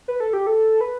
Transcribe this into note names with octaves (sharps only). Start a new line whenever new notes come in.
B4
A4
G4
A4
B4